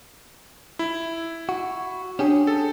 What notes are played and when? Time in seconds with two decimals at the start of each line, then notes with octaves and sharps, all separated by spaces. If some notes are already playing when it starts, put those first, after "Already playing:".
0.79 E4
1.49 F#4
2.19 C#4 D4 G4 G#4 C#5
2.47 A4